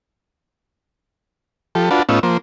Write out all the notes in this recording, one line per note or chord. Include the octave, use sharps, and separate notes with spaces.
F3 G4 A4
D4 F4 F#4 B4 A5
A2 B3 C#4 D#4 F4 E6
F3 A#3 C5